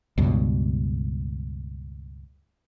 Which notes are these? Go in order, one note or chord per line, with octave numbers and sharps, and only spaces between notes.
C#2 G2 B2